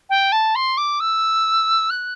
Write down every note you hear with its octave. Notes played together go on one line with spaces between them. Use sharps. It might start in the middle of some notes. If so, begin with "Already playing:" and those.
G5
A5
C6
D6
E6
F#6